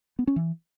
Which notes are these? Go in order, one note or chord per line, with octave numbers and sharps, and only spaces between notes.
B3
C#4
E3